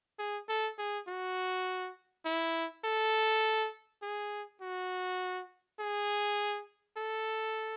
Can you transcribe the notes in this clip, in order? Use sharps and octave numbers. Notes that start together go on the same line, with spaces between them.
G#4
A4
G#4
F#4
E4
A4
G#4
F#4
G#4
A4